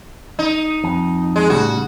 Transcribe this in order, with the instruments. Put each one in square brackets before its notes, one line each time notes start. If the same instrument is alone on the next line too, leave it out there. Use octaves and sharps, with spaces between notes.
[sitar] D#4
[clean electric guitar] F2
[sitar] G#3
[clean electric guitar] A2 C#3 G3 [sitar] F#4